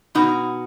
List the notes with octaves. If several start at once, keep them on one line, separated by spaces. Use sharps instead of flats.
B2 D#4 F#4